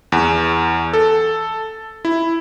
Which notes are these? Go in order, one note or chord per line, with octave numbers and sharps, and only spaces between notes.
E2
A4
E4